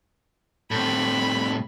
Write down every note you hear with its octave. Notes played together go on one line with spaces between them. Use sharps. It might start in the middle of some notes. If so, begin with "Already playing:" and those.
A2 C3 B5